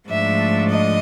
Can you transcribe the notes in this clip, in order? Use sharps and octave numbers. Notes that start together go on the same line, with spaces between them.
G#2 F3 A3 D4 E5
D#5